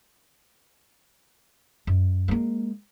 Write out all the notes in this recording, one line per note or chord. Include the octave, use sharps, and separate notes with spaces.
F#2
G#3 A#3